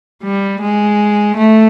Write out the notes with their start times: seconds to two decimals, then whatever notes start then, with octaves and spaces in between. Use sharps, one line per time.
0.24 G3
0.61 G#3
1.37 A3